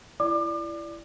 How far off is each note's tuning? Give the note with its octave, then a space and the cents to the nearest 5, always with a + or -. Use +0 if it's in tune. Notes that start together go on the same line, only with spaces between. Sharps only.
E4 +25 D5 +0 D6 +35